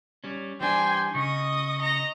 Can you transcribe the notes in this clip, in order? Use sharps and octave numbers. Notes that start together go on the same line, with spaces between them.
G3 C#4
E3 G3 D4 C5 G5 G#5
C#3 D#5 C#6 D#6
D#5 A#5